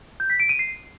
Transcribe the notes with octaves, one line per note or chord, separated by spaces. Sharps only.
G6
B6
D7
D#7
C7